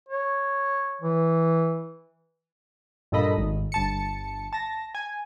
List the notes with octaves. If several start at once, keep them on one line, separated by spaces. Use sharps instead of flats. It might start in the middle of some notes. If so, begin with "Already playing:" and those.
C#5
E3
G2 A#2 A4 D#5 B5
G#1
G1 A5 C#7
A5 A#6
G#5